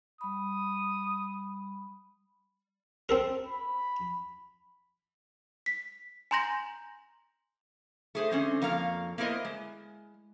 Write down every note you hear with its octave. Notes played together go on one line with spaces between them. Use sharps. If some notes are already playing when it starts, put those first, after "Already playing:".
G3 B5 D#6
C4 A4 A#4
B5
B6
G#5 A#5 C6 G6 A#6 F#7
A3 G#4 C5
D3 G#3 C4 C#4
F2 A#3 C#5 F5 A#5
A#3 B3 E4 A#4 C5 D#5
G#3